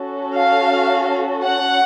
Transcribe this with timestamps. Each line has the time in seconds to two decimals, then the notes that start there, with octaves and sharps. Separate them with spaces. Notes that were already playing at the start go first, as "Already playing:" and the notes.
Already playing: C#4 F#4 A4
0.35 F5
1.44 F#5